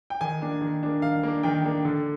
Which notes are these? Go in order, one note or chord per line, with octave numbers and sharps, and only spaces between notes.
G5
D#3 G#5
A#3 D4
D#3
A#3 D4
D#3 F5
A#3 D4
D#3 G5
A#3 D4
D3